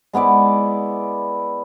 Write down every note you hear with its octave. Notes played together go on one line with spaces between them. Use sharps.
G#3 B3 E4 D5